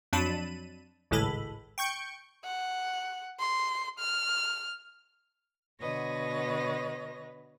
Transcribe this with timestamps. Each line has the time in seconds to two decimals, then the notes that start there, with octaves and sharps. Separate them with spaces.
0.13 F2 F#3 D4 A5 B5 D#7
1.11 G#1 C#2 A2 G#3 A4 B5
1.78 G5 C#6 G6 C#7
2.45 F#5
3.40 C6
3.99 F6
5.80 B2 D3 B4 C#5 D#5 A#6